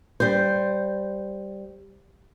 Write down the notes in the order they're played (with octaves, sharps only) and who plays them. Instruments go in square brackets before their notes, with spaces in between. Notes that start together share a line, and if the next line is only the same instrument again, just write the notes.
[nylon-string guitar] G3 C5